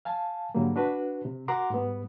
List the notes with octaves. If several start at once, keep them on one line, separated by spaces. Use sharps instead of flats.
F5 G#5 A5
G#2 D3 F#3 G3 A#3
D4 F#4 B4
C3
F#4 A#4 F#5 A#5 C6 D6
G#2 G3 B3